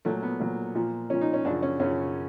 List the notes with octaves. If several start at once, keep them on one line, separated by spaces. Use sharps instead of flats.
A#2 F#3 A3
B3
A#2 F#3
A#2 F3
A#2 F3 C#4
D#4
C#4
F#2 C#3 F3 D4
C#4
F#2 C#3 F3 C#4